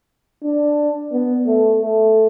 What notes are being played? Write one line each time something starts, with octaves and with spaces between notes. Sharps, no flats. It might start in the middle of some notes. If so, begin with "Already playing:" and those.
D4
B3
A3
A3